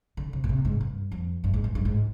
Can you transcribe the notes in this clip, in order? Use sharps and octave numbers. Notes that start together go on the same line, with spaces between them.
D3
C3
A#2
C3
G#2
G2
F2
G2
G#2
G2
G2
G#2